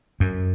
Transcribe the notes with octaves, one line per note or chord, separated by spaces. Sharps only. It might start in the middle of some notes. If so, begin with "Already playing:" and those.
F#2